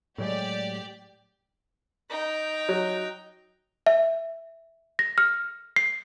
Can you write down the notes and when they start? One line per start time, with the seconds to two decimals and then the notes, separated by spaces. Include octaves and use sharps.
0.18 A2 F#3 G#3 G4 D5
2.09 D#4 G5
2.69 F#3
3.87 E5
4.99 A#6
5.18 F6
5.76 C7